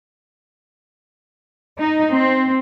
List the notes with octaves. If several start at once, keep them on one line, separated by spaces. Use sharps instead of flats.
D#4
C4